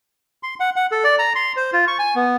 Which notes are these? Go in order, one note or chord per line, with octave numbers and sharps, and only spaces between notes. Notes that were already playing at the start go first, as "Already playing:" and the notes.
C6
F#5
F#5
A4
D5
A#5
C6
C5
F4
C#6
G#5
B3